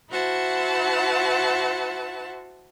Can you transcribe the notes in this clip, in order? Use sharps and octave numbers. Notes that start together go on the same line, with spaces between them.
E4 F#4 C5 F#5 A5